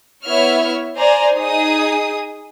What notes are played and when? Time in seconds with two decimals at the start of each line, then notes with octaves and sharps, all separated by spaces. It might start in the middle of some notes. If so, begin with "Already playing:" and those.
0.25 B3 E4 C#5 E5 F6
0.98 C5 D5 G#5 A#5
1.35 D#4 G#4 D#6